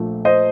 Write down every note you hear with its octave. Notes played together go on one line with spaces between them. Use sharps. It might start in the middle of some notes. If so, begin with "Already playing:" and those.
Already playing: A#1 A#2 F3 A3
C5 D#5